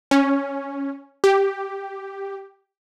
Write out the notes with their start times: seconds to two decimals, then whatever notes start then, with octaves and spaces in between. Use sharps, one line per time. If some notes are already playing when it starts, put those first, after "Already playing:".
0.11 C#4
1.24 G4